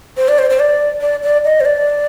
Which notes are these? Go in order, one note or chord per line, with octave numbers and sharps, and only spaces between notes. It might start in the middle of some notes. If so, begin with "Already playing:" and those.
C5
D5
C5
C5
D5
D5
D5
D#5
C5
D5